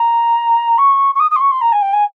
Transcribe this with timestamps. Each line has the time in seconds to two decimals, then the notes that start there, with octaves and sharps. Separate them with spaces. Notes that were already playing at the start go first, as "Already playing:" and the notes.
Already playing: A#5
0.78 C#6
1.15 C#6
1.19 D#6
1.31 D#6
1.36 C6
1.41 C#6
1.51 C6
1.61 A#5
1.72 G#5
1.82 G5
1.93 G#5